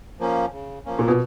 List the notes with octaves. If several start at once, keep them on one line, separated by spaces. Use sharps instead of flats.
F3 A#3 C#4
C#3
F3 A#3 C#4
A#2
B2